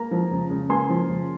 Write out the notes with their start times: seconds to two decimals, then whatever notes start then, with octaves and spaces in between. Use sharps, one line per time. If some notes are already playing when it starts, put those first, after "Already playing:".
Already playing: A#3 A#5
0.11 F3
0.31 C#3
0.50 C#3
0.69 A#3 G#5 C6
0.89 F3
1.09 C#3